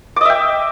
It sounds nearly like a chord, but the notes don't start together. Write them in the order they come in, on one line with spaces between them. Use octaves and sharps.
D6 D#5 E5 G5